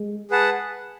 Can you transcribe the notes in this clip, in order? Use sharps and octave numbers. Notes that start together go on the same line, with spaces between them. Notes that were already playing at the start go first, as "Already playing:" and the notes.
Already playing: G#3
G#4 B4 F#5 A5